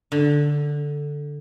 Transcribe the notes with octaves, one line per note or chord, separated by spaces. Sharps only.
D3